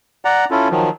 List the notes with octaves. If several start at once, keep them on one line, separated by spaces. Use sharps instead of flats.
D5 F#5 A#5
C#4 E4 F4 A4
D#3 F3 F#3